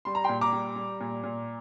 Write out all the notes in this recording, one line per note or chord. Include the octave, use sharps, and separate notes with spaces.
G3 C6
A#5
A#2 G5 C6
A#5 D6
G3
G3
A#2
A#2